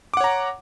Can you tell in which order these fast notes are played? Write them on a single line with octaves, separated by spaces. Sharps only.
D6 F#5 C#5 A#5